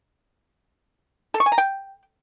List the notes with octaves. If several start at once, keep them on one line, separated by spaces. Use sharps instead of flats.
A4
C#6
G#5
A#5
G5